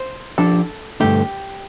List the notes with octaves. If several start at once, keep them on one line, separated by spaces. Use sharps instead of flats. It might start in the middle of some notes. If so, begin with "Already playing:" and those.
Already playing: C5
F3 D4 G4 A4
G2 D3 A3 D4 G4